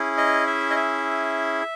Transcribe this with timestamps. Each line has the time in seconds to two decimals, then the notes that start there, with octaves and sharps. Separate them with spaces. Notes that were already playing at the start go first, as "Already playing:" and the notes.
Already playing: C#4 E4 G#4
0.17 D#5
0.47 E5
0.71 D#5
0.76 E5